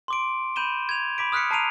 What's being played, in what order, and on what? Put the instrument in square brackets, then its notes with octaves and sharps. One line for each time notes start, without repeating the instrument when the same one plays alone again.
[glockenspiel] C6 D6 D7
B5 G6 D#7 E7 G7
G#6 F7
B5 D6 B6 D7
D#6 F6 F#6 B6 C#7
A5 A#5 C7 D7 D#7 F7